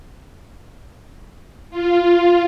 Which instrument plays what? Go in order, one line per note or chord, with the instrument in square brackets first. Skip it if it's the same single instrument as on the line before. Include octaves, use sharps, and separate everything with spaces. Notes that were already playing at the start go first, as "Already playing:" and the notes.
[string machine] F4